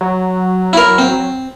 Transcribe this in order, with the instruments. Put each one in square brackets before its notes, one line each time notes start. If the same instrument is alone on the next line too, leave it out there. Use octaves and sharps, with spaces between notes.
[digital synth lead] F#3
[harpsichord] E4 A#4
C4